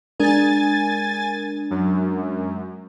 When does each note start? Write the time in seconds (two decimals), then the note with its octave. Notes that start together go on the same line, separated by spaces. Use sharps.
0.20 G#3 D4 A#4 G#5 A6
1.70 F#2